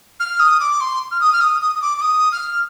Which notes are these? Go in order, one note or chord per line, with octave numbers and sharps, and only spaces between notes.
F6
D#6
D6
C6
F6
D#6
F6
D#6
D#6
D#6
D6
D6
D#6
F6